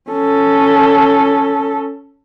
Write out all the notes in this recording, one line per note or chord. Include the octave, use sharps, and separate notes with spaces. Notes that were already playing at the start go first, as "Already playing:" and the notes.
C#4 A4